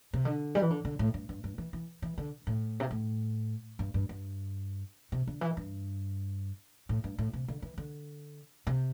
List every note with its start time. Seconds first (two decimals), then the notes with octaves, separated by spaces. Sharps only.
0.13 C3
0.25 D3
0.55 G3
0.62 E3
0.70 D3
0.85 D3
0.99 A2
1.14 G2
1.29 G2
1.44 G2
1.58 E3
1.73 E3
2.02 E3
2.18 D3
2.47 A2
2.80 C3
2.91 A2
3.79 G2
3.94 G2
4.09 G2
5.12 C3
5.27 D3
5.41 E3
5.57 G2
6.89 A2
7.04 G2
7.18 A2
7.33 C3
7.48 D3
7.62 E3
7.78 D3
8.67 C3